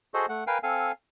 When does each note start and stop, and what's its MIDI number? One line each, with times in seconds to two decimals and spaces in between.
0.14 0.26 66
0.14 0.26 68
0.14 0.26 69
0.14 0.26 72
0.14 0.26 75
0.29 0.44 57
0.29 0.44 78
0.47 0.58 70
0.47 0.58 71
0.47 0.58 77
0.47 0.58 79
0.47 0.58 80
0.63 0.92 60
0.63 0.92 69
0.63 0.92 77
0.63 0.92 80